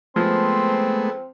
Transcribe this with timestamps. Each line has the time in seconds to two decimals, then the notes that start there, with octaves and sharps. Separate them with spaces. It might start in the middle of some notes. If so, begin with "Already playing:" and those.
0.16 F3 G#3 A3 B3 C4 C6